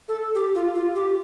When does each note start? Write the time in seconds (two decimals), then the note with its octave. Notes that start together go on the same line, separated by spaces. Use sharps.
0.08 A4
0.35 G4
0.55 F4
0.75 F4
0.95 G4